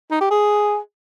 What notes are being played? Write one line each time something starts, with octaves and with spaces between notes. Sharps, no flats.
D#4
G4
G#4